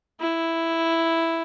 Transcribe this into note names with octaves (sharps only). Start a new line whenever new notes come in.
E4